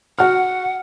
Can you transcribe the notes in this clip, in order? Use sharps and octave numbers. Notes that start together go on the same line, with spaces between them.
F#4 F#5 F6